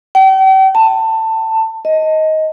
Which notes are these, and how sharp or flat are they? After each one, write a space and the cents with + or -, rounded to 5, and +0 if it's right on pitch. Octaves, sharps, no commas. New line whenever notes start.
G5 -40
A5 +20
D#5 +15